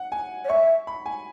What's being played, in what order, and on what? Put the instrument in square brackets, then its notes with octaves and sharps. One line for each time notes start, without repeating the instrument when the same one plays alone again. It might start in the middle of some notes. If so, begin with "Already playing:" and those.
Already playing: [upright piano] F#5
G#5
[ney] C#5
[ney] E5 [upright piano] C#6
[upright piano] B5
G#5